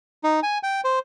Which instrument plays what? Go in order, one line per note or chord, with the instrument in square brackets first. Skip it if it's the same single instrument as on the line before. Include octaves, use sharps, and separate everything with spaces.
[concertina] D#4
G#5
G5
C5